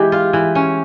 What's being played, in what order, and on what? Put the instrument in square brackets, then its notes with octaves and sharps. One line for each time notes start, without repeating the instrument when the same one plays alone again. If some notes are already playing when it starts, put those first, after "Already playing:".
Already playing: [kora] E3 G#3 [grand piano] G4
[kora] F4
E3
C#4